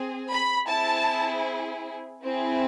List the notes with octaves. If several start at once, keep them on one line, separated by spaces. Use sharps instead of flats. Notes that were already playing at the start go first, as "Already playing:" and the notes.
Already playing: C4 G#4
B5
C4 E4 G#4 A5
C4 E4 G#4